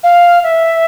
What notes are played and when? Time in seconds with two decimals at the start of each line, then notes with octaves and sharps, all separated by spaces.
0.04 F5
0.43 E5